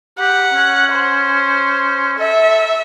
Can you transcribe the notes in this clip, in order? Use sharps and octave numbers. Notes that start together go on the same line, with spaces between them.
G4 F#5
C#4
C5
A4 E5